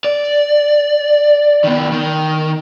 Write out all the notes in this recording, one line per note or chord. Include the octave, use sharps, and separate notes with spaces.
D5
D#3 B3
D#3